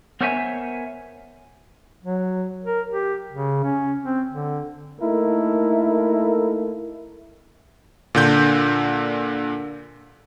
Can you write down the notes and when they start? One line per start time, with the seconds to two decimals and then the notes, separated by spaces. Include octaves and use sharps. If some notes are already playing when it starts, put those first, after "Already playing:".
0.21 B3 A#4 C5 C#5 E5 G#5
2.04 F#3
2.64 A#4
2.90 G4
3.33 C#3
3.64 C#4
4.03 C4
4.34 D3
5.00 A3 A#3 D#4 E4 A4 A#4
8.15 A#2 D3 G6